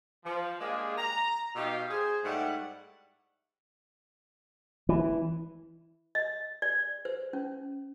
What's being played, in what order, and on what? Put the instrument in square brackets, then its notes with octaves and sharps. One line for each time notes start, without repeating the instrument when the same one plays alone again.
[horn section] F3
G#3 A#3 D4 F4 G4 G#4
A#5
B2 D#4 G4 F5 G5
G#4 C5
G#2 G3 A3 E4 F#5
[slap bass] E3
[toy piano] D#5
D5
C5
C#4